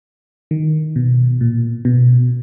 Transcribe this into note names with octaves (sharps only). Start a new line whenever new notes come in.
D#3
B2
A#2
B2